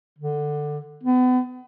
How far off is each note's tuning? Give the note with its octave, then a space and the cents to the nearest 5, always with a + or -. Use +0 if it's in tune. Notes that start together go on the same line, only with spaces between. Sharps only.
D3 +10
B3 +35